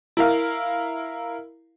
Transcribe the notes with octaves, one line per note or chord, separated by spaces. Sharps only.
E4 A#4 F5